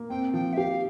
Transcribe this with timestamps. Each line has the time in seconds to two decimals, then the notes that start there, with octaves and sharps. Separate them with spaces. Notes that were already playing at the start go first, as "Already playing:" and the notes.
Already playing: A#3
0.10 C4 G5
0.33 F3 G5
0.53 E5
0.57 G4 F5